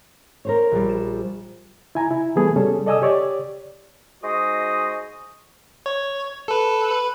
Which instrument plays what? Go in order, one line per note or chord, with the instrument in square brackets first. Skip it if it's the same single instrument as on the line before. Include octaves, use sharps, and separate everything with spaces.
[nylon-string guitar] A#4 C5 C#5
[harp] A#1 G3
E7
[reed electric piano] E4 G#5 A#5
E4
E3 G3 A3 B3 G#4 A4
G3 C#4 G#4 A4
A4 D5 D#5 G#5 D#6 E6
G4 C#5 D5
[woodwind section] G#3 D#4 F#4 C5 D#5 D#6
[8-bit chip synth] C#5
A4 B4
B4